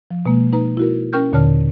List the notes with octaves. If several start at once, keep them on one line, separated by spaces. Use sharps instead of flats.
F3
B2 G#3 A#3
D#4 B4 A#5
E4 F#4 A#4
C#4 A#4 G5 C#6 F6 G6
D#2 A#2 D3 C#5 A5 F6